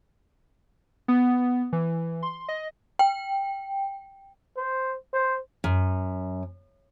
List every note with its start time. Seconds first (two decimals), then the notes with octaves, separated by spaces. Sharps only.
1.08 B3
1.73 E3
2.23 C6
2.48 D#5
2.99 G5
4.57 C5
5.13 C5
5.64 F#2